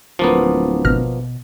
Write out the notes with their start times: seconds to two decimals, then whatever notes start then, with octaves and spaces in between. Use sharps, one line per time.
0.19 D1 F3 A#3 B3
0.84 G#1 B2 F6 A#6